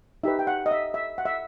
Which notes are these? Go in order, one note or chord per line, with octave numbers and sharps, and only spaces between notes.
D#4 G4 B4 E5
G5
F#5
D#5
E5
E5
F#5
E5